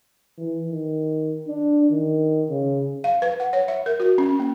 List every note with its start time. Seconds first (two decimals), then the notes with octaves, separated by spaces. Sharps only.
0.38 E3
0.71 D#3
1.47 D4
1.91 D#3
2.50 C#3
3.04 F5
3.22 B4
3.40 F#5
3.53 C#5
3.68 E5
3.86 A#4
4.00 F#4
4.18 C#4
4.39 A#3